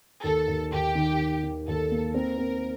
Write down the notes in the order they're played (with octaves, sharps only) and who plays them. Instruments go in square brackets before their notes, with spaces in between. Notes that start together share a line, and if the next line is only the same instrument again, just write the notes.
[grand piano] D#2 [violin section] A4
[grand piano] D#2
[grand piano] D#2 [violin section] G4
[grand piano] D#3
D#3
D#3
[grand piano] D#2 [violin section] A4
[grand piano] A#3
[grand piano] C4 [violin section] A#4
[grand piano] C4